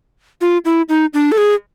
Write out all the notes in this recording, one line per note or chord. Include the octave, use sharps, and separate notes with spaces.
F4
E4
D#4
D4
A4
G#4